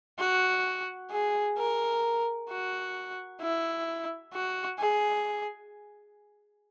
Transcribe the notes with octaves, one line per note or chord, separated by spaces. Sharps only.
F#4
G#4
A#4
F#4
E4
F#4
G#4